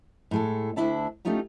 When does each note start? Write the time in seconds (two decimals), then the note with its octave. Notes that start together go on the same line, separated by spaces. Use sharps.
0.31 A2 G#3 A4
0.76 D2 G2 D4 E4 E5 A5
1.25 A3 C#4 D#4 F4 G4